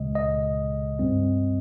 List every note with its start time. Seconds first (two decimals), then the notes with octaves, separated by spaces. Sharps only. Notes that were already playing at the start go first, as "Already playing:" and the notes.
Already playing: C#2 C#3 G#3 D#5
0.15 D#5
0.99 G2 G3 C4